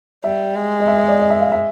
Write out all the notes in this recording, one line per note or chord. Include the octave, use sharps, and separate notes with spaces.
G3 E5
G#3
D#5
E5
D#5
D5
D#5
E5
F5
E5